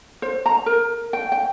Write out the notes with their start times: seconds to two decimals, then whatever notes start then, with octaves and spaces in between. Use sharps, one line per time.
0.22 C5
0.46 A#5
0.66 A#4
1.13 G5
1.32 G5